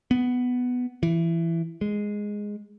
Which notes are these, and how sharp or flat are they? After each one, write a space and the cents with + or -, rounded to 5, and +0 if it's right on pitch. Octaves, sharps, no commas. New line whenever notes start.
B3 +5
E3 +15
G#3 -5